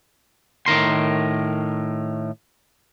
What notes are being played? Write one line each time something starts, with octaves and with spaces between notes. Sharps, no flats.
A2 D#3 A#4 C6